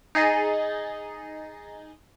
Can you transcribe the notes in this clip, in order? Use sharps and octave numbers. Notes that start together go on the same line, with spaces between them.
D#4 G#4 D#5 A6